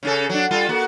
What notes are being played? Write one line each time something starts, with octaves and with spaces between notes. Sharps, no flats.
C#3 C#4 A4
F#3 D4
G3 F4 A4
A#3 F#4